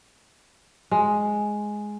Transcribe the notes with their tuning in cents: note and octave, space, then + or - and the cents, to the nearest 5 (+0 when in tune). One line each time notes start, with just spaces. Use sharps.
G#3 +5